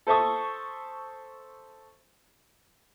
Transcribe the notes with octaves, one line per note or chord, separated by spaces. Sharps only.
A4 C5 E5 A5 C#6 D#6